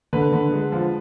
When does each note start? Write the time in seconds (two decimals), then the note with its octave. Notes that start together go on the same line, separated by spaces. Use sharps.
0.13 D3 B4
0.33 D3
0.52 G#3
0.72 F3